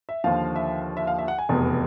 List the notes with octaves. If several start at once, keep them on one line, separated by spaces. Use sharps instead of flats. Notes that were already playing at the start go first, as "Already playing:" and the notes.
E5
D#2 D3 F3 F5
E5
E5
F5
E5
F#5
G#5
F1 E2 B2